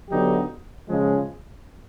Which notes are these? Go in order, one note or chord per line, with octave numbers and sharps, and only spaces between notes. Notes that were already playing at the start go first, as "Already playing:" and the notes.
D3 F#3 B3 D#4 G4
C#3 F3 G#3